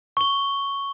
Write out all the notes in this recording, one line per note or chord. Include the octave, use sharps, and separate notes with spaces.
C#6 G7